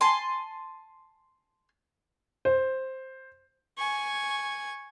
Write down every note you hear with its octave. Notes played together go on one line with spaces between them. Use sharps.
G#5 A5 C6
C5
G#5 C#6